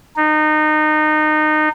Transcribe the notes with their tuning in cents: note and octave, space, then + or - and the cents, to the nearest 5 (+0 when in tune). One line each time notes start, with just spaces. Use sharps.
D#4 -25